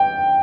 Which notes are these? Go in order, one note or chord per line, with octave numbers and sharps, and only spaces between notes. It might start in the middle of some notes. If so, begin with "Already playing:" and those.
Already playing: G5